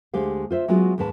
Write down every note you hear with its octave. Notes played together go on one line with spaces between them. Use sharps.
D2 D3 G#3 G4 C5 F5
F4 C5 E5
F#3 G#3 B3 C#4 F4 F#4
D#2 G#2 G#3 B4 A5